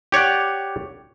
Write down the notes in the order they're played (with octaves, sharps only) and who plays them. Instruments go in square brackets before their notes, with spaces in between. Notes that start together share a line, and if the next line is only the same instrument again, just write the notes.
[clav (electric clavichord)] G4 C#5 D5 F#5